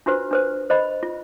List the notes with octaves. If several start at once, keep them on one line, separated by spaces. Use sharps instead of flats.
D4 F4 F#4 B4 C5
D4 B4 C5
C5 D#5 B5
F4